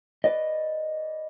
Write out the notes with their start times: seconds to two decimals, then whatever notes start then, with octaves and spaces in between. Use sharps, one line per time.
0.24 B4 D5 D#5